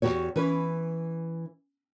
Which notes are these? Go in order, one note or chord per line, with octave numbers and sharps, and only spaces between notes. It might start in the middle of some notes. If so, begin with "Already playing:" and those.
E2 C#3 F#4 G4 C#5
E3 C#4 B4